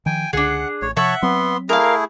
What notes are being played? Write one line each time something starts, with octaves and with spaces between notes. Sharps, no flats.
D#3 F3 G5 G#5
C#2 D3 D4 G#4 F#5
A1 C#5
C3 F3 C#5 E5 F#5 A5 C#6
F#3 B3 C4 C6
A3 E4 G#4 A#4 F5